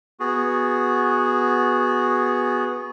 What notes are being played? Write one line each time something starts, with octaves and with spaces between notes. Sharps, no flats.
B3 F#4 G#4